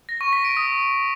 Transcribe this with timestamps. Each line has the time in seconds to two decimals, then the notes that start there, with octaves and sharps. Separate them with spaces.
0.09 A#6
0.21 C#6
0.33 B6
0.45 D7
0.57 D#6